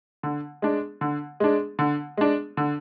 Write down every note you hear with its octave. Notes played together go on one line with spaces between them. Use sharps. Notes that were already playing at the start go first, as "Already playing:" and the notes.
D3
G#3 D4
D3
G#3 D4
D3
G#3 D4
D3